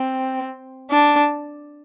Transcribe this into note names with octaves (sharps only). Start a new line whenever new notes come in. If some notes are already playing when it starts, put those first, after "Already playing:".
Already playing: C4
D4